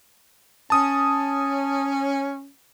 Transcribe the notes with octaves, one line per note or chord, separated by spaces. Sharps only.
C#4 A5 D#6